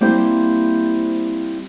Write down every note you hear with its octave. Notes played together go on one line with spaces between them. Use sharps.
G3 A#3 C4 E4 C5